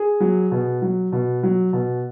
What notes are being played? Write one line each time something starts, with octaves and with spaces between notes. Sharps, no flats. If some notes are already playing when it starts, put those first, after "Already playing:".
Already playing: G#4
F#3
B2
F#3
B2
F#3
B2